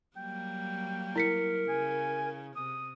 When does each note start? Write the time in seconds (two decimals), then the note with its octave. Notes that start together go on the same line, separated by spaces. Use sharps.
0.17 F#3 G3 A#3 G5
1.16 E4 A#4 B6 C#7
1.69 C#3 G#5
2.56 C3 D#6